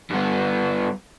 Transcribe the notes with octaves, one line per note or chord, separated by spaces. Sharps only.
G2 B3